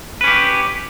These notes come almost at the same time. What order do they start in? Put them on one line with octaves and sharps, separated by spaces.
B4 C#4 G4